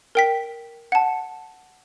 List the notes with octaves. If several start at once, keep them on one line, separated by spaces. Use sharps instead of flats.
A#4 G5 B6
F#5 A5